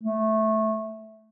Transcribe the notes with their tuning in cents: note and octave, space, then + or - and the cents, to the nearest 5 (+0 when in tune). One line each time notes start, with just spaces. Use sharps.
A3 -10